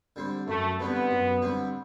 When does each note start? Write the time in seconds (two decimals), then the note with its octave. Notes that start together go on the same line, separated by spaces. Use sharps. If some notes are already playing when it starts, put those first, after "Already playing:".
0.16 D3 G3 C4
0.48 F#2 A3
0.79 D3 G3 B3 C4
1.11 F#2
1.42 D3 G3 C4